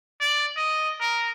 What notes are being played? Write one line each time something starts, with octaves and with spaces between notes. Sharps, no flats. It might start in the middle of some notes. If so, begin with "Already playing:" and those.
D5
D#5
A#4